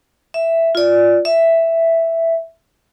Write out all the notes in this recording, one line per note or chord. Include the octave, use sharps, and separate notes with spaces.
E5
F4 D5
E5